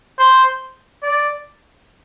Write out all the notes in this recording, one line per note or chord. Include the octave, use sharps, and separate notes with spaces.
C5
D5